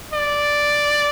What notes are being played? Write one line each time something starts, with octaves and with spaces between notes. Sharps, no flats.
D5